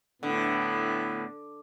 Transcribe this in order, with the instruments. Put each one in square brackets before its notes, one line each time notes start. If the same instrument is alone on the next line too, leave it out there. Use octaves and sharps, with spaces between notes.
[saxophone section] A2 B3 [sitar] D3